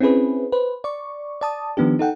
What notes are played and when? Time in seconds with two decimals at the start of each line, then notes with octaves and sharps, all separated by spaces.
0.01 C4 C#4 E4 G#4 B4
0.52 B4 C5
0.84 D5 C#6
1.41 D5 A5 D#6
1.77 D#3 F3 B3 D4 G4
1.99 D#4 A4 F#5 G5